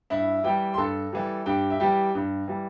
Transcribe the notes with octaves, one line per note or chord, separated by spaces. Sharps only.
G2 E4 E5
E3 G3 G4 G5
C6
G2 A4 A5
E3 G3
G2 G4 G5
E5
E3 G3 G4 G5
G2
E3 G3